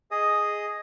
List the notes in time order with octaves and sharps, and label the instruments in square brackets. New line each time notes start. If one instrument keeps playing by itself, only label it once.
[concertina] G#4 D#5 D#6